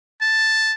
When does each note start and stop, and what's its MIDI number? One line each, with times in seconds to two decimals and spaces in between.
0.21 0.74 81